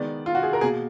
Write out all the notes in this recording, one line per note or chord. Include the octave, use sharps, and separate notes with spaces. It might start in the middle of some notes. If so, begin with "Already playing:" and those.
Already playing: D#3 G#3 B3 D5
F4
F#4
G#4
A#4
B2 A#3 G#4